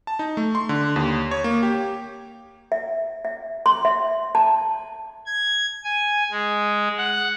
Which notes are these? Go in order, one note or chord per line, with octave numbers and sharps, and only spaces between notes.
A5
D#4
A3
C6
D3
D#2
C#5
A#3
G4
E5
E5
C6
E5
A5
G#6
G#5
G#3
F#5